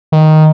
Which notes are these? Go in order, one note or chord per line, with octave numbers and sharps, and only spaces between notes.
D#3